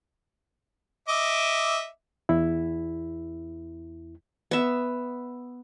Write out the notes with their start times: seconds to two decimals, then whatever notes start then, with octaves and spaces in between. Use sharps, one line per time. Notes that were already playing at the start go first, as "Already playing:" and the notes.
1.08 D#5 E5 D6
2.29 E2 E4
4.51 B3 E5